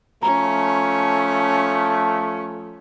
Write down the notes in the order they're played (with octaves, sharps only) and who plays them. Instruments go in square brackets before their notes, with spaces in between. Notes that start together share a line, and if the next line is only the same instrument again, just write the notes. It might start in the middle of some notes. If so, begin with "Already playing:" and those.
[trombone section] F3 A3 [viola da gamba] C#4 [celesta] A#5